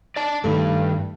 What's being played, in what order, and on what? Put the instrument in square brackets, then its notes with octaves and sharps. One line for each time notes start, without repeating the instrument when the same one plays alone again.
[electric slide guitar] D5 A5
[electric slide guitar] G2 [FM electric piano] D#3 A3 A4